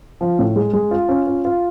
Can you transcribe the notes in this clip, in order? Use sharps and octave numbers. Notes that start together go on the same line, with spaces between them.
F3
A2
G#3
G#3
F4
C#4
F4
F4